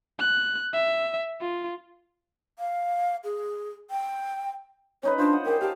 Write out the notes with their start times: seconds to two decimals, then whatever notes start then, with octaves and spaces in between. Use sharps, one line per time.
0.20 F#6
0.73 E5
1.41 F4
2.59 F5
3.24 G#4
3.90 G5
5.03 C#4 D#4 B4 C#5
5.18 D4 F4 C5 D#5
5.33 D#5 F#5
5.46 G4 G#4 A#4 G5
5.61 G4 F5 A5